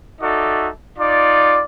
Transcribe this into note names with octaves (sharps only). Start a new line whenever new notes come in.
D#4 F#4 A4 D5 E5
D#4 F4 D5